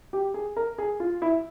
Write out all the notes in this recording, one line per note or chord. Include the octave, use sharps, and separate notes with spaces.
G4
G#4
A#4
G#4
F4
E4